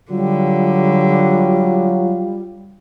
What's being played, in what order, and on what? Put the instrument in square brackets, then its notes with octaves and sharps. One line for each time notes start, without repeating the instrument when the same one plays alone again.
[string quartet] D3 [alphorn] F#3 [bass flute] G3 [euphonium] F4